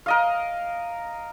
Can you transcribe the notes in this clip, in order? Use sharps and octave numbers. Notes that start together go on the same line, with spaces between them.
A#4 D#5 F5